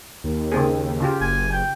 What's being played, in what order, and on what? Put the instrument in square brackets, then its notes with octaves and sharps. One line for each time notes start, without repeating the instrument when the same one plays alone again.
[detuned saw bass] D#2
[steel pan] C#3 C4 G#4
C#3 F4 G4
[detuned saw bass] F#1 [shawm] G#5
[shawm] G5